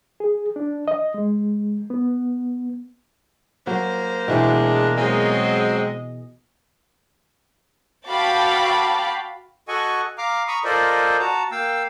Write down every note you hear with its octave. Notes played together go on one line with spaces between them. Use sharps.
G#4
D4
D#5
G#3
B3
F#3 A#3 C5
B2 E3 G#3 D4 G5
F#3 G#3 C4 G#4 D#5
F#4 F5 G5 A5 B5 D6
F#4 A4 D#5 F#5 G#5 C#6
F5 A#5 D6 F6
A#5 B5 C#6 D#6
F4 A4 A#4 C5 D5 D#5
F#4 A5 A#5
A#3 F5 G5 E6